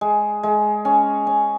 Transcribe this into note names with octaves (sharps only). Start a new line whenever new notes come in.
G#3
G#3
C#4
C#4